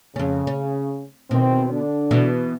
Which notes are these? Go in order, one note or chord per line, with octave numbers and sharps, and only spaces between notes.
F2 C#3 C#4
C#4
E2 B2 D#3 C4
D3 D4
B2 E3